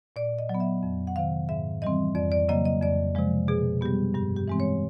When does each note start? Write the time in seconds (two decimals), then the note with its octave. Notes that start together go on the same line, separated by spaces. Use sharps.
0.16 A#2 D5
0.39 D#5
0.49 F#3
0.54 B3
0.60 E5
0.83 F2
1.07 F#5
1.16 C3 D#3 F5
1.49 G#2 E5
1.82 E3 G3 C4 D#5
2.15 F2 D5
2.32 D5
2.49 C#3 F#3 A#3 D#5
2.65 D#5
2.81 F2 D5
3.15 C3 F3 G#3
3.48 B2 G#4
3.81 G3 B3 G4
4.14 G2 G4
4.36 G4
4.48 E3 G#3 C4
4.60 C#5